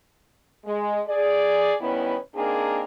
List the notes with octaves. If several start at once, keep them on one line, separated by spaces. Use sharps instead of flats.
G#3
G#4 D5
D#3 G3 B3 C#4 E4 B4
A#3 C4 D4 D#4 G#4 A#4